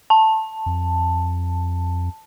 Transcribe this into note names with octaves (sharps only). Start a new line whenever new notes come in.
A5
F2